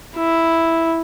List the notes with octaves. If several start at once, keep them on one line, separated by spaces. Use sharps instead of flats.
E4